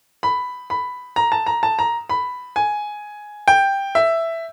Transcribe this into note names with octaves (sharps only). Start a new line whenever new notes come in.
B5
B5
A#5
A5
A#5
A5
A#5
B5
G#5
G5
E5